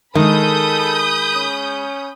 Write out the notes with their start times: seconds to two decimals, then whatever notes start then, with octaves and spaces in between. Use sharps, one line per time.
0.15 D#3 G#3 G#4 A4 B5 D#6 G6
1.35 C#4